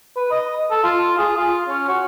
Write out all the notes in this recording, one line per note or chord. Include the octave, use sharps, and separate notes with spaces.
B4
D#5
A4
F4
G#4
F4
C#4
F#4